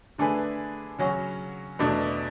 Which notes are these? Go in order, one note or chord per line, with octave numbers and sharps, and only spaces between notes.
D3 A3 D4 G#4 B4
C#3 F#3 C#4 F#4
E2 B2 A3 D4